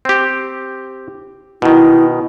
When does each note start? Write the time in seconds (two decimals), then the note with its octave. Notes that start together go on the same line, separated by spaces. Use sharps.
0.05 C4 G4
1.62 B2 D#3 E4